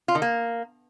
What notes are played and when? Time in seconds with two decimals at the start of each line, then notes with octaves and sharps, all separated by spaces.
0.08 F4
0.15 D#3
0.22 A#3